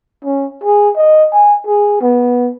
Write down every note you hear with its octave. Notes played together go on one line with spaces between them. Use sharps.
C#4
G#4
D#5
G#5
G#4
B3